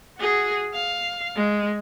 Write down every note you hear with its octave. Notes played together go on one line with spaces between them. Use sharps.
F#4 G#4
F5
G#3